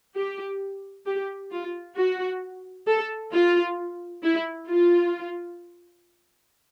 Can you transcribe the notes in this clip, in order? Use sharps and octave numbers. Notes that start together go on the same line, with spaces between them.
G4
G4
F4
F#4
A4
F4
E4
F4